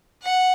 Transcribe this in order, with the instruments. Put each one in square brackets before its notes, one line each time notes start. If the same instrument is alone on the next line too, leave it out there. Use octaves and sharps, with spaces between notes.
[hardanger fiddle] F#5